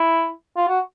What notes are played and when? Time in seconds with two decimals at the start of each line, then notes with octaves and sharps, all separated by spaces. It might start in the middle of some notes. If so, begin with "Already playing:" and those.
Already playing: E4
0.57 F4
0.68 F#4